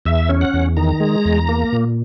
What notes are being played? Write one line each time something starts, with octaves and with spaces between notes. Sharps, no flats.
E2 E5
C#4
F#5
E2
D#3 A#5
G#3
E2
A#3
A#2